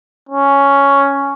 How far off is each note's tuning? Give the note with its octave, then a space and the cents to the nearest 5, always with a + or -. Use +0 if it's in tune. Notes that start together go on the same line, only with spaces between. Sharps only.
C#4 +5